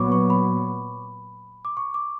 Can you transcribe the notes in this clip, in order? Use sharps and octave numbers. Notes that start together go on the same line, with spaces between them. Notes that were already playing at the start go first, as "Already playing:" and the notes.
Already playing: A#2 F#3 B3 B5 C#6 D6
C#6
B5
D6
C#6
D6